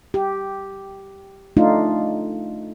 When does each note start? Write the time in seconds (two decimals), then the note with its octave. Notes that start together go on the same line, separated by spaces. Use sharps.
0.14 G4
1.57 A3 D4 D#4 F4